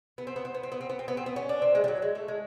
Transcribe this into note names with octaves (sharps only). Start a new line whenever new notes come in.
B3
C4
B3
C4
B3
C4
B3
C4
B3
C4
B3
C4
B3
C#4
D4
C4
G#3
G3
F#3
G#3
A3
G#3